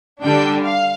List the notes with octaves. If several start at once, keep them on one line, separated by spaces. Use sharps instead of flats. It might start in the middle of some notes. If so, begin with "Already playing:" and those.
D3 G3 D4 G5
F5